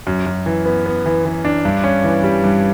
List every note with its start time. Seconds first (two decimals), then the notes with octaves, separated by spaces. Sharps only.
0.07 F#2
0.26 F#2
0.46 E3
0.66 B3
0.86 B3
1.06 E3
1.25 E3
1.45 D4
1.65 G2
1.84 C#4
2.04 E3
2.24 G3
2.44 G2